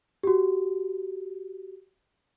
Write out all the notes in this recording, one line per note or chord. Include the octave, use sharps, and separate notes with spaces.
F#4 G4